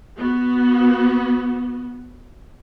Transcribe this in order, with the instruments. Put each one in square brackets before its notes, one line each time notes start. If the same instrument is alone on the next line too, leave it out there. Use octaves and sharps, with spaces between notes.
[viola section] B3 F#4